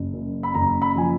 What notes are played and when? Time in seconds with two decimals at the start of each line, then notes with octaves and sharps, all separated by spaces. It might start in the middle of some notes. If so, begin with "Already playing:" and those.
Already playing: F#1
0.13 F#2
0.43 B5
0.54 F#1 A#5
0.82 B5
0.96 F3 G#5